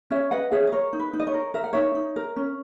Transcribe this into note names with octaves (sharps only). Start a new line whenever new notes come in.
C#4 C#5 E5
B4 D#5 F#5
G#4 C#5 E5
D#5
A#4 C#5
D#4
B4
D#4
D#5
C#5
A#4
A#4 E5
F#5
D#4 C#5 E5
D#4
A#4
C#4